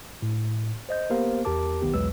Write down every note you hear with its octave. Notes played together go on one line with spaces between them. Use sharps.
A2
C5 D#5 G6
A#3 B3 G4 A#4 C5 F5
E2 G4 A#4 A5 D6
B1 D#3 B3 G4
B1 E2 F#3 G#3 B4 E6